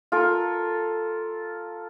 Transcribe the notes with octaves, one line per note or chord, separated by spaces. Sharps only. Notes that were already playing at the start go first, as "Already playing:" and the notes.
F4 A4 A#4